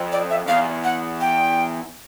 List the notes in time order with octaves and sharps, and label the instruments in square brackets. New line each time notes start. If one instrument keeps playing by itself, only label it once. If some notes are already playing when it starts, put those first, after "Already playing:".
Already playing: [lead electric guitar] F2
[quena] D5
E5
[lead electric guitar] E2 [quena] F5
[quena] F#5
G5